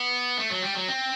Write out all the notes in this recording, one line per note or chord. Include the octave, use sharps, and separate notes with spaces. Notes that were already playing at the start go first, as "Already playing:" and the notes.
Already playing: B3
A3
F#3
G3
F#3
C4